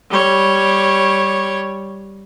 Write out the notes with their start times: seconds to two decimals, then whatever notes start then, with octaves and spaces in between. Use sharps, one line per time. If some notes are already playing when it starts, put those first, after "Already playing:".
0.10 G3 C#5